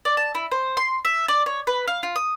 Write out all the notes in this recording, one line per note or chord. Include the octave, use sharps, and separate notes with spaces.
D5
A5
E4
C5
C6
E5
D5
C#5
B4
F5
F4
D#6